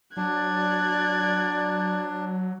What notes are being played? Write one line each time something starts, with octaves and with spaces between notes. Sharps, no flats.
F#3 D4 D5 F#6 G#6